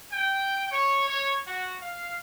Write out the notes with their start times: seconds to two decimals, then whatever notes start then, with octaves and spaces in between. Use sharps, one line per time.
0.10 G5
0.71 C#5
1.08 C#5
1.46 F#4
1.80 F5